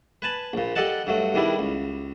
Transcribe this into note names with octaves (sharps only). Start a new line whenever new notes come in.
B4 G#5 A5 B5
A#1 A#2
G4 A4 D5 D#5 F#5 A5
G2 F#3 A3
E2 D#3 G3 D4 E4
C#2